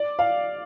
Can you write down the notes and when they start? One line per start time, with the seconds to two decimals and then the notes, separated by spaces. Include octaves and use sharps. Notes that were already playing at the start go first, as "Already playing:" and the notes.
Already playing: D5
0.19 F5